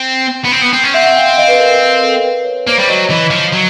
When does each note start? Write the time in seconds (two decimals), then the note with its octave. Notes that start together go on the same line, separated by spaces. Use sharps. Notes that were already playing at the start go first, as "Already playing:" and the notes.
Already playing: C4
0.45 B3
0.52 C4
0.61 B3
0.73 C4
0.84 C#4
0.94 C4 E5 F#5
1.05 F#5
1.16 F5 G5
1.37 D#5 F5
1.48 B4
1.58 A#4
1.70 A#4
1.80 A#4
2.02 A4
2.24 B4
2.45 C#5
2.67 A#3 C5 D5
2.77 G3 C#5
2.88 F#3 C#5 D#5
3.10 E3 C#5 D#5
3.31 F3
3.53 F#3